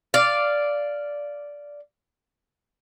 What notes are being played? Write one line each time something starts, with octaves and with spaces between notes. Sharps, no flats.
D5 F5